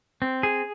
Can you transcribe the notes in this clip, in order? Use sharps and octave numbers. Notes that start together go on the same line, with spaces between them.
C4
G#4